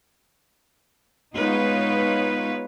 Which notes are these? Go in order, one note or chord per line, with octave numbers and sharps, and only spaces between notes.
G#3 B3 D#4 F4 B4 C#5